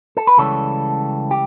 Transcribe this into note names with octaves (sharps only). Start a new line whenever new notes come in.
A4
B4
C#2 C#3 E3 G3 A4 C#5
G4